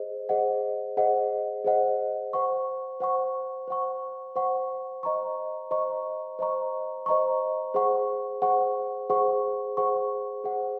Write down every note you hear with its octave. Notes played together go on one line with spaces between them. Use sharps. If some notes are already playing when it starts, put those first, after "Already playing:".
Already playing: G#4 C5 D#5
G#4 C5 D#5 F#5
G#4 C5 D#5 F#5
G#4 C5 D#5 F#5
C5 F#5 C#6
C5 F#5 C#6
C5 F#5 C#6
C5 F#5 C#6
C5 D#5 A#5 C#6
C5 D#5 A#5 C#6
C5 D#5 A#5 C#6
C5 D#5 A#5 C#6
G#4 C5 F#5 C#6
G#4 C5 F#5 C#6
G#4 C5 F#5 C#6
G#4 C5 F#5 C#6
G#4 C5 F#5